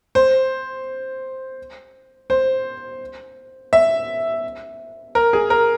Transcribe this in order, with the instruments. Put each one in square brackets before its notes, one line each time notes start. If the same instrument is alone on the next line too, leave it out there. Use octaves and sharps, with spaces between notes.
[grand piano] C5
C5
E5
A#4
G#4
A#4